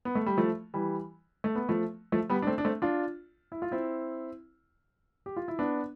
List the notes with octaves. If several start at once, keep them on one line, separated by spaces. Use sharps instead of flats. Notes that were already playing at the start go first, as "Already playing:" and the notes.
B3
A3
G3
F3 A3
E3 G3
A3
B3
F3 A3
F3 A3
G3 B3
D4
A3 C4
D4
A3 C4
D4 F4
E4
F4
C4 E4
G4
F4
E4
B3 D4